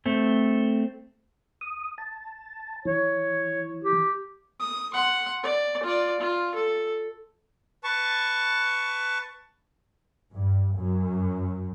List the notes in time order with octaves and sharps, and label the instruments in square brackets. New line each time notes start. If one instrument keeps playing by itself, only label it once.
[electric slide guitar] A3 C4
[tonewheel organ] D#6
A5
[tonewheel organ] E3 [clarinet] C#5
[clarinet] G4
[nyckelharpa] D#6
F#5 C6
D5
F4 D5
F4
A4
[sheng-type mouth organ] B4 A5 C#6
[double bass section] G2
F#2